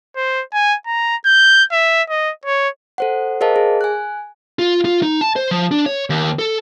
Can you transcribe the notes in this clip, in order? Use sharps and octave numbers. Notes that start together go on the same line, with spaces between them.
C5
G#5
A#5
G6
E5
D#5
C#5
A4 C5 F#5
G#4 A#4 C5 D#5 F5 A5
G#4
G#5 F#6
F4
F4
D#4
A5
C5
F3
D4
C#5
D#2
A4